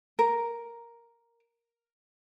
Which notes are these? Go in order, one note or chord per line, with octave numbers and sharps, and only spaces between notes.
A#4